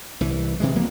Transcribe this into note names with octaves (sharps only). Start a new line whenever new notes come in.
C2 E3
C3 E3 G#3
C#2 F3 A#3 B3